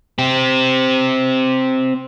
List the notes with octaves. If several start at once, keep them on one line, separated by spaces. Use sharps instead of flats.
C4 G4